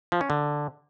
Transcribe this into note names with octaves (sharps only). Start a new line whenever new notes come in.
F3
C#4
D3